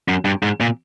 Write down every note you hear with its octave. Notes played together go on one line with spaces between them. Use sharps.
F#2
G2
G#2
A#2